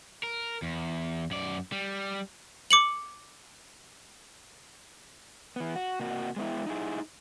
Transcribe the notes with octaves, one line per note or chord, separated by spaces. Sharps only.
A#4
E2
F#2 D5
G3
D6 C#7 F#7
E3 B3
F#4
C3 A#3 F#4
G#3 B3 E4
D#4 E4 G#4